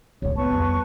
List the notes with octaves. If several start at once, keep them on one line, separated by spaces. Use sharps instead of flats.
C#2 A2 C#5
B3 B4 A5 C#6
F2 G3